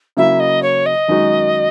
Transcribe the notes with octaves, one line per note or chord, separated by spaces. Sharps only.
C#3 F#3 A#3 E4 E5
D#5
C#5
D#5
F#2 D#3 G#3 D#4 F#4